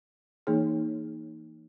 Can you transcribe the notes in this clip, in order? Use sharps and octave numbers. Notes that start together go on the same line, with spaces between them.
E3 A#3 D#4 G#4 C#5